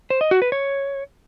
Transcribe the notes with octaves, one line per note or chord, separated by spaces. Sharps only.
C5
D#5
F#4
B4
C#5